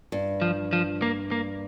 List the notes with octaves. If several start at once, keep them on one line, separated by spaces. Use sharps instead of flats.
G2
F3
F3
A#3
A#3